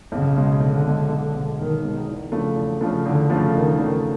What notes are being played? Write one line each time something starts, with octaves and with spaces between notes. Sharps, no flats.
B1 C#3
B2 G#3
B1 D3
B2 G#3
B1
B2 G#3
B1 D#3
B2 G#3
E2
C#3 F3 A3 D4
E2
C#3 F3 A3 D4
E2 D3
C#3 F3 A3 D4
E2 D#3
C#3 F3 A3 D4